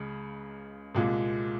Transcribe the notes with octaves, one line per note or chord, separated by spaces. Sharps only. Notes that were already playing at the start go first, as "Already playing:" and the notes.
Already playing: C#2 C#3 G#3
C2 A#2 G#3